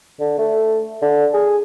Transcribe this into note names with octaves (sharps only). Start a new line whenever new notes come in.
D3
A3
D3
G#4